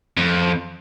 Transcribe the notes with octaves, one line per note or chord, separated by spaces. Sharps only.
F2